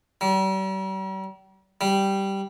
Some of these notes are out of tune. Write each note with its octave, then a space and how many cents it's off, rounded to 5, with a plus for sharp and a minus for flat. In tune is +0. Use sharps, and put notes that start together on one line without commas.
G3 -40
G3 -5